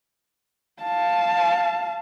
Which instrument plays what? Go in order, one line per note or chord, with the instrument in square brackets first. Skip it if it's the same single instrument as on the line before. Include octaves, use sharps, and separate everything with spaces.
[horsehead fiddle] F5 A5